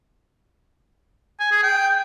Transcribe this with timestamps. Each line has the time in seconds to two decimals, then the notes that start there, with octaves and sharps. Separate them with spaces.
1.40 G#5
1.52 G#4
1.63 G5